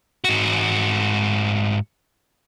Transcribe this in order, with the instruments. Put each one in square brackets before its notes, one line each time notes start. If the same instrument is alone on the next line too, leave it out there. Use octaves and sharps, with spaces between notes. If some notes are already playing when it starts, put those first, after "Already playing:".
[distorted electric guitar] G#2 F#4